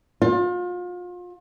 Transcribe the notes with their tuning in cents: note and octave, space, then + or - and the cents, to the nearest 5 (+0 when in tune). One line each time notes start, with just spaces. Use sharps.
F4 +35